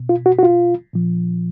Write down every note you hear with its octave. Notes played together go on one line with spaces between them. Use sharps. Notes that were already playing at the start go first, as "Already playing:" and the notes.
Already playing: B2
F4
F#4
F#4
F4
A#2 F3